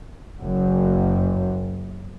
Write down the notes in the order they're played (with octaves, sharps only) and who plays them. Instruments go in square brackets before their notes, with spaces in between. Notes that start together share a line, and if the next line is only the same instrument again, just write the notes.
[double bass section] F#1 F#2